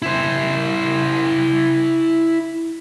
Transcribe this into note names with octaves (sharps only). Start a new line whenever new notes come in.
E4 C5